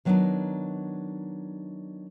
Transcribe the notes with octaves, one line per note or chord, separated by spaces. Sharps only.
D#3 F#3 A#3 B3 D4 D#4